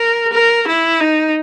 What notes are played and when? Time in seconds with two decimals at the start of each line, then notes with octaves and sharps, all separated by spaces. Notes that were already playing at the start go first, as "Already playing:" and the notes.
Already playing: A#4
0.33 A#4
0.67 E4
1.00 D#4